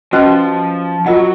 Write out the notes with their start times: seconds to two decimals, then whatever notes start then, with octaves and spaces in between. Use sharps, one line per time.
0.12 F3 C#4 F#4 B4 D#5
1.06 F#3 F4 A#4 D#5 F#5